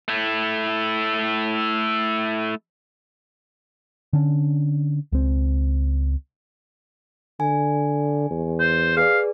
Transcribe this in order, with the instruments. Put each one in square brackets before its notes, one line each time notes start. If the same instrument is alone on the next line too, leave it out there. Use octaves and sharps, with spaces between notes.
[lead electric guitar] A3 E4
[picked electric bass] D3 C#4 D4
C#2 C4
[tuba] D3 [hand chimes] G#5
[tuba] E2
[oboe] C5
[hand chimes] G#4 B4 D5 [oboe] F5